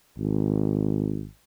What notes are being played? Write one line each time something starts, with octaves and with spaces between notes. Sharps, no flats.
G#1